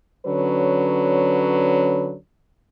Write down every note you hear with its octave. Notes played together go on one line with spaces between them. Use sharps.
D3 F#3 C#4 B4